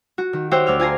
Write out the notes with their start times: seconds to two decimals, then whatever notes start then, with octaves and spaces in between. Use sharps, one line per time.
0.18 F#4
0.33 D#3
0.51 F#4 G4 C5 C#5 E5 G5
0.66 D2 D5 E5 F6
0.80 F4 G#5 A#5 C6